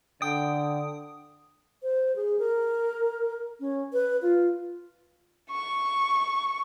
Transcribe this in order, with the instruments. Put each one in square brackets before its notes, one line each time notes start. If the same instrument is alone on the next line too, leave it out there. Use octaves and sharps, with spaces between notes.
[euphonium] D3 [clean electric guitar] G5 [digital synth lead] D#6
[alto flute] C5
G#4
A#4
C#4
B4
F4
[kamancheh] C#6